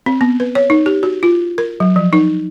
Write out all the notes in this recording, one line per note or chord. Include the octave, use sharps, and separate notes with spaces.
C4
B3
B4
C#5
D#4
G4
F#4
F4
A#4
F#3
F3
D#4